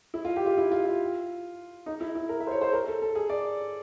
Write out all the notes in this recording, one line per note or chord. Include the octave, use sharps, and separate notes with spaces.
E4
F4
G4
F4
E4
F4
F4
D#4
E4
E4
A#4
E5
C5
C#5
C5
A#4
A4
A4
G#4
D5